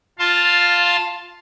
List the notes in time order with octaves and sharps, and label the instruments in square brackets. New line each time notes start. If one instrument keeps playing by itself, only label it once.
[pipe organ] F4 F5 A5 C6